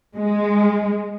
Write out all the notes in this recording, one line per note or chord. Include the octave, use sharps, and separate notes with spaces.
G#3